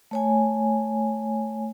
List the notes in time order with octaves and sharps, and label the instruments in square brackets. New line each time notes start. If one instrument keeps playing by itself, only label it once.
[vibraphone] A3 C#5 G#5